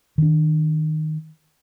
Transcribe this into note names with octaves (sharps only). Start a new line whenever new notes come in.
D#3 D4